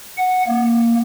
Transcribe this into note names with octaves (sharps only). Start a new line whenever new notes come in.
F#5
A#3